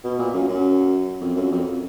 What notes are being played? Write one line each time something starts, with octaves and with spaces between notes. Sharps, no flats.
B2
A#2
F#2
F#2
F2
F#2
F2